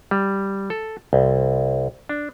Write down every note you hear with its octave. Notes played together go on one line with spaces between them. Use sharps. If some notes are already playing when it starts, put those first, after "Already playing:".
G3
A4
C2
D4